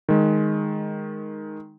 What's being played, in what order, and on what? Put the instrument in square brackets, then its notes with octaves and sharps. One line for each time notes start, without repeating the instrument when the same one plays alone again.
[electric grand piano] D#3 G#3